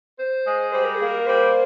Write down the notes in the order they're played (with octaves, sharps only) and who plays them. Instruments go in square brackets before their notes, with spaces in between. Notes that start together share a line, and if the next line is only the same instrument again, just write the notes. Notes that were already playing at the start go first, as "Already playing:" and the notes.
[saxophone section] C5
G#3
[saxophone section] G3 [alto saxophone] C5
[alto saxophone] A#4
[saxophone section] A#3 [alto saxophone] G#4
[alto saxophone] A#4
[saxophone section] G3 [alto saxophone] C5